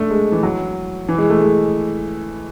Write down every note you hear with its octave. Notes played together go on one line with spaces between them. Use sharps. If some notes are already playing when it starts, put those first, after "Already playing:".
Already playing: A3 D4
G#3
E3
F#3
E3
G#3
A3
G#3